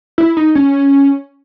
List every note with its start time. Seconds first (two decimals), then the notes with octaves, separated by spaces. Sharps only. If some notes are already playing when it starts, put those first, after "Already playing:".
0.18 E4
0.37 D#4
0.55 C#4